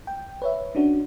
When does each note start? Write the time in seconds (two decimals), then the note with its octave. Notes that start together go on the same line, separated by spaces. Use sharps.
0.07 G5
0.42 B4 C#5 E5
0.75 C#4 D4 F#4